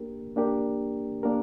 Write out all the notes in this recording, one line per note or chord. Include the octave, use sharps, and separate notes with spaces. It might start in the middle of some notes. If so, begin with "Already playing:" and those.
Already playing: A#3 D4 G4 A#4
A#3 D4 G4 A#4
A#3 D4 G4 A#4